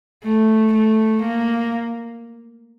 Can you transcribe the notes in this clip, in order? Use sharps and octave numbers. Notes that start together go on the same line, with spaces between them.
A3
A3
A#3